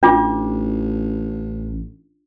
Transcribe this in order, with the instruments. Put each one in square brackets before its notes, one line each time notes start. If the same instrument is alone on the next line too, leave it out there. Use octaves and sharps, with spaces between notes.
[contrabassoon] A1 [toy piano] D4 F4 D6